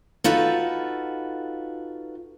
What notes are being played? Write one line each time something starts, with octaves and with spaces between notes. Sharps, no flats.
D#4 F4 F#4 A4 B4